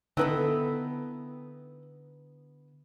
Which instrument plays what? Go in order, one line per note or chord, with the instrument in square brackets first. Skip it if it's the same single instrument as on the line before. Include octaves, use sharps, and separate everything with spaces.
[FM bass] D3 [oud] B3 E4 A4 [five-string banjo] C4 D#4 B4